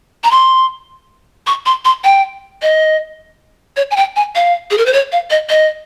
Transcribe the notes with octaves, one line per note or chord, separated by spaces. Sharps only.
A#5
C6
C#6
C6
C6
G5
D#5
C#5
G#5
G5
G#5
F5
G#4
A#4
C5
C#5
F5
D#5
D#5